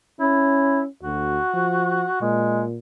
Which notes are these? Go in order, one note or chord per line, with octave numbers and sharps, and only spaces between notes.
C#4 E4
D2 F#4
F3
A#2 G#3